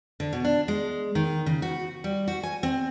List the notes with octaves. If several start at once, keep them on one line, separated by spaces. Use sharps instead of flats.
D3
B2
D4
G#3
D#3
C#3
F#4
G3
F#4
G#5
C4